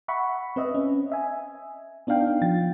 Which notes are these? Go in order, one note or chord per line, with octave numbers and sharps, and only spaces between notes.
E5 F#5 B5 C#6
C4 B4 D#5 E5
C#4
D#5 E5 G#5
B3 D4 D#4 F5 G5
F3 G5 A6